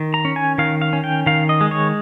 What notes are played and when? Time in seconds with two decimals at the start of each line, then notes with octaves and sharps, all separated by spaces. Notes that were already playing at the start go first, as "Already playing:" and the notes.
Already playing: D#3
0.14 A#5
0.25 C#4
0.36 G#5
0.58 D#3 F5
0.82 F5
0.93 C#4
1.04 G5
1.26 D#3 F5
1.49 D#5
1.61 G#3
1.71 C#5